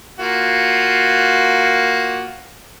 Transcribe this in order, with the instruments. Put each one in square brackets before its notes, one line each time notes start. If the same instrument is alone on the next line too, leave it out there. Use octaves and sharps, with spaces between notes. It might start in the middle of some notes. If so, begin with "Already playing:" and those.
[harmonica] A#3 F4 F#4